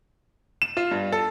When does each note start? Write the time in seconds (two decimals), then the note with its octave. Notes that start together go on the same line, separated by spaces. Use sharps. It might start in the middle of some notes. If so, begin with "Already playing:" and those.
0.62 E7
0.77 F4
0.91 G2
1.12 A4